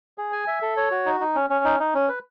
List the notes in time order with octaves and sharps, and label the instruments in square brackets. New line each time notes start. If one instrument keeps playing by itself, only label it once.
[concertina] G#4
G#5
E5
A4
C#5
F#4
D#4
D#4
C#4
C#4
D#4
D#4
C#4
B4